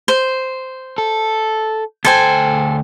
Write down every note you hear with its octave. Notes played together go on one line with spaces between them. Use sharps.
C5
A4
D2 A4 C5 G5 G#5